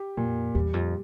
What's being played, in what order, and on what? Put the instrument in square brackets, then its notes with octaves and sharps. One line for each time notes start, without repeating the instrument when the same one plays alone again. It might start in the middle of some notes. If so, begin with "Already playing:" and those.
Already playing: [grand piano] G4
[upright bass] F2 [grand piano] A#2
[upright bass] E2 [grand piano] G3
[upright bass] F2